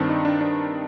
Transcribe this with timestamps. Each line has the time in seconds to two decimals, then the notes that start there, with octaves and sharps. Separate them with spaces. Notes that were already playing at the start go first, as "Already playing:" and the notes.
Already playing: G2 D#3 C4 D4
0.09 D#4
0.25 D4
0.41 D4